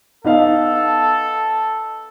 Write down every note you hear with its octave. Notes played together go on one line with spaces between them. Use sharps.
B3 D#4 A4 F5